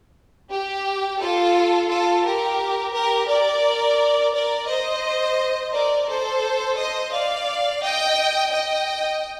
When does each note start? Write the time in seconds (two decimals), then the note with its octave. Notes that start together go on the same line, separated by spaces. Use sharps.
0.51 G4
1.20 F4 A4
1.90 F4 A4
2.25 G4 A#4
2.94 G4 A#4
3.29 A#4 D5
4.34 A#4 D5
4.68 C5 D#5
5.73 A#4 D5
6.08 A4 C5
6.78 C5 D#5
7.12 D5 F5
7.82 D#5 G5
8.52 D#5 G5